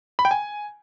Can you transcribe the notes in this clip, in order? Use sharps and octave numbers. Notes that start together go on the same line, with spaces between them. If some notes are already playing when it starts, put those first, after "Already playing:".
B5
G5
G#5